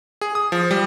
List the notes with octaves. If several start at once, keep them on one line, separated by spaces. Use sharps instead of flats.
G#4
D#6
F3
G3